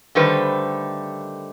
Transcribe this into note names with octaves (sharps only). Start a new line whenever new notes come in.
D3 D#3 G3 A3 B4 C5